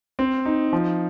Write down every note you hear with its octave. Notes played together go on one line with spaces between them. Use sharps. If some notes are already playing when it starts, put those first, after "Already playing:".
C4
D#4
F3